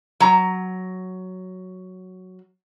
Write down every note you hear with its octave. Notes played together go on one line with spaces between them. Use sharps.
F#3 A#5